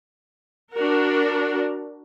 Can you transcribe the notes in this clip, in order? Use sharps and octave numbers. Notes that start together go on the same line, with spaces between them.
D4 F#4 A#4